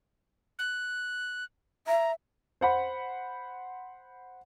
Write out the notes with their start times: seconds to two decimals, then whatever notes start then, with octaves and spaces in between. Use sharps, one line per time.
0.59 F#6
1.87 E5 A#5
2.61 C5 F#5 B5